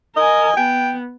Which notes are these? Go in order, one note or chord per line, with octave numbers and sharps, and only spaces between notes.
A#4 D#5 G#5
B3 G5